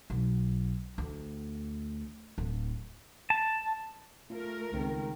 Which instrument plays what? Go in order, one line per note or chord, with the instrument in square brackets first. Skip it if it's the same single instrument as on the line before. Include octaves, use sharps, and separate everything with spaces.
[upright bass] B1
D2
D1
[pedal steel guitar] A5
[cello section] A3 A#4 [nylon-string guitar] F4
[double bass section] C#2 [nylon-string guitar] D#3 C4